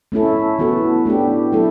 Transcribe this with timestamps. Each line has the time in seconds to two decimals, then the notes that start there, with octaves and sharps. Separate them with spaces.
0.12 A3 C#4 E4 A4
0.59 E3 B3 F#4 A4
1.05 A3 D4 G4
1.52 F#3 A3 E4 A4